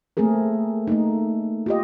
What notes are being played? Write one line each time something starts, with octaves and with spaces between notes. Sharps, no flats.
A3 A#3 C4 G#4 A#4
A3 A#3 D#4
F4 G4 D#5